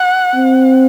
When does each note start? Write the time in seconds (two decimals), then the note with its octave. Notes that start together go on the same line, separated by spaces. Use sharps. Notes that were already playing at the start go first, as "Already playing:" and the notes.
Already playing: F#5
0.35 C4